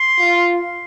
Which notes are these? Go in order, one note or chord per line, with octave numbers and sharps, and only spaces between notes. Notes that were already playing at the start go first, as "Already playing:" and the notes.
Already playing: C6
F4